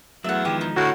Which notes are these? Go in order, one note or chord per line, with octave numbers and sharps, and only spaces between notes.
E2 F#3 A3 E5 F#5
D#3 F3 G#3 G4
D#4
A2 D3 F#4